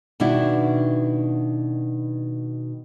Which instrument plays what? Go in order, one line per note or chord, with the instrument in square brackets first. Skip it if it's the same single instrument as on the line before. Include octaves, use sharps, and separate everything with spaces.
[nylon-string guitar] B2 D#3 D4 E4 F#4